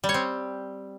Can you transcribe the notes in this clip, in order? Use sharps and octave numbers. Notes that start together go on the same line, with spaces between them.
G3
C#5
C4